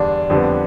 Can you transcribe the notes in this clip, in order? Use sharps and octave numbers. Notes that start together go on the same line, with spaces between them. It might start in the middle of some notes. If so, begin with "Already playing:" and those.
Already playing: E2 D3 G3 D4
F2 D3 G3 B3